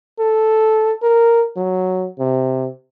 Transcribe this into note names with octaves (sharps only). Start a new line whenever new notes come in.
A4
A#4
F#3
C3